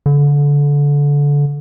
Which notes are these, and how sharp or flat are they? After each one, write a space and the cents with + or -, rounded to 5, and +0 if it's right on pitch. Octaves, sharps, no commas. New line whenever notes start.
D3 -25